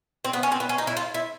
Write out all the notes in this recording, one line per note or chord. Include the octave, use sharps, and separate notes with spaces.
C4
B3
C#4
C4
B3
C#4
D#4
E4
F4
E4